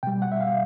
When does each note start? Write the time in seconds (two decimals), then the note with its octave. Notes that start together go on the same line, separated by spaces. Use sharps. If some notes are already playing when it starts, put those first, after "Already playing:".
0.03 B2 G3 G5
0.22 F#5
0.32 E5
0.41 F5